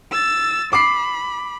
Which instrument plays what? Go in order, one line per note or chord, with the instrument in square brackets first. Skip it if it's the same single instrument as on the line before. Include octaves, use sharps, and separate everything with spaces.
[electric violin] E6 A6
[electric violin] B5 [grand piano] D6 C7